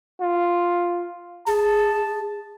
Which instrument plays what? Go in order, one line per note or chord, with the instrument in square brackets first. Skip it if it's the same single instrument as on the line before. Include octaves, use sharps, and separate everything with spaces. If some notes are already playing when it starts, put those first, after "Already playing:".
[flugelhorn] F4
[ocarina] G#4 [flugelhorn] A5